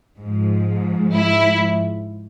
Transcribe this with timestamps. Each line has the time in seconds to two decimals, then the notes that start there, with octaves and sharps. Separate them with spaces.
0.20 G#2 F3
1.14 E4